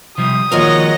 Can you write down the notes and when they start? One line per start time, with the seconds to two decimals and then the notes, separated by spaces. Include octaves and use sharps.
0.18 C3 F3 G3 D#6
0.52 A#2 D#3 F3 G#3 F#4 A#4 C#5 D#5